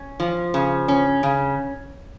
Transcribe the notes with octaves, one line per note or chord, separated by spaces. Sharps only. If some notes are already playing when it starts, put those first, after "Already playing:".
Already playing: C#4
F3
C#3
C#4
C#3